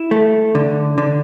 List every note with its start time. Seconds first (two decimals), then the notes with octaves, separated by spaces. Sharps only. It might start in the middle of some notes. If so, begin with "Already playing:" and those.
Already playing: E4
0.11 A3
0.55 D3
0.98 D3